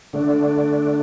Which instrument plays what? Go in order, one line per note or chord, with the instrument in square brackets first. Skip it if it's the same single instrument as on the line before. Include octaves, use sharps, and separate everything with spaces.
[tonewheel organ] D3 A3 D4